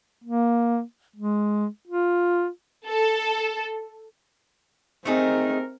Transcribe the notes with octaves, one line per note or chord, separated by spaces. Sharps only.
A#3
G#3
F4
A4
A3 C4 D#4 G#4 A#4